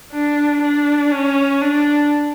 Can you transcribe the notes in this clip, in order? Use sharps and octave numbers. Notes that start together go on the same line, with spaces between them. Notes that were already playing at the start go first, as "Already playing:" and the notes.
D4
D4
C#4
D4